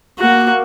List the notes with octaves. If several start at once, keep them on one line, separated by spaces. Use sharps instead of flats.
A#3 F#4